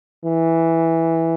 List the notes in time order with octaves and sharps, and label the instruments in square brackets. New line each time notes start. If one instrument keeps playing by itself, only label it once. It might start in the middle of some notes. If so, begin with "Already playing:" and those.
[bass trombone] E3